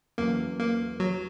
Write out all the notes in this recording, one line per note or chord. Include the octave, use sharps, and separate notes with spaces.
E2 C#3 F#3 A#3
A#3
F#3